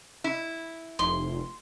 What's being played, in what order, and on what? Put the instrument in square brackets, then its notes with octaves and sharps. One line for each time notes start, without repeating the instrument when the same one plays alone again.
[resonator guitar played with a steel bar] E4
[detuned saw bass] F1 [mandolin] C6